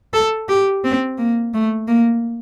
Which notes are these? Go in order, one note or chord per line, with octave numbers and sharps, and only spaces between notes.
A4
G4
C4
A#3
A3
A#3